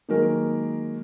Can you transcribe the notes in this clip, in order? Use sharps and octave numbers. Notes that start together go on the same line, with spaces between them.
D#3 F#3 G#3 A#3 A#4